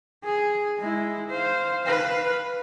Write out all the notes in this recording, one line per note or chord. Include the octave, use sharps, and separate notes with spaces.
G#4
G#3 E4
C5 F5
B4 F5